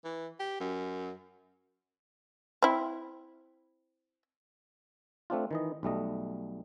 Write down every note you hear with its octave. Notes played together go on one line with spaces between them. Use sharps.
E3
G4
F#2
C4 E4
A3 C4 D4 F4
D#3 E3 D#5
B1 G3 A3 D#5